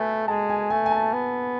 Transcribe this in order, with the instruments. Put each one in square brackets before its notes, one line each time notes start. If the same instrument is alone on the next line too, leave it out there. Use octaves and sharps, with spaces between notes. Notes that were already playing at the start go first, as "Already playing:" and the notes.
Already playing: [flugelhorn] A3 [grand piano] A4 B4 G#5
[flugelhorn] G#3 [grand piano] A5
[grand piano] G#5
[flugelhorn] A3 [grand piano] G#5
[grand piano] G#5
A5
[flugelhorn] B3